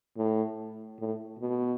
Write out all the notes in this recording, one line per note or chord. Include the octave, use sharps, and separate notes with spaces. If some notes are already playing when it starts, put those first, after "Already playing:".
A2
A2
B2